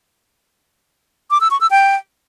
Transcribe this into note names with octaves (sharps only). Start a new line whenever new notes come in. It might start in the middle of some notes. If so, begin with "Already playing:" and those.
D6
E6
C#6
E6
G5